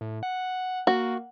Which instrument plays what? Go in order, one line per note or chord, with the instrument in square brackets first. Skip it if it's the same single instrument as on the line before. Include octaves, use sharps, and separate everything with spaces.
[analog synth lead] A2
F#5
[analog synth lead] A#3 [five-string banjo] F#4